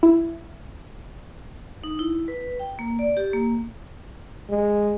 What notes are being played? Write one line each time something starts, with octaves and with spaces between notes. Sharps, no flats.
E4
D#4
E4
B4
G5
A#3
D5
G4
A#3
G#3